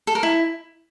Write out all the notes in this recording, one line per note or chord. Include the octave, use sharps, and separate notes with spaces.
A4
A#4
E4